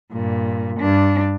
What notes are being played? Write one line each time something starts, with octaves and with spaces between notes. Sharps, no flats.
G2 A#2
G2 D4